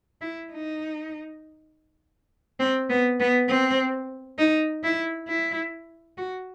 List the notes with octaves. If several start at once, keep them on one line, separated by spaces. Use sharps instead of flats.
E4
D#4
C4
B3
B3
C4
D#4
E4
E4
F#4